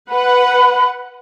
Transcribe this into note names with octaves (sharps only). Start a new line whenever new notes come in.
B4 F#5 B5